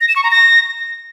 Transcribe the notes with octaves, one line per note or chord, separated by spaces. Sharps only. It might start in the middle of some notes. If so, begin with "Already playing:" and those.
A#6
E7
C#6
A#5
A#6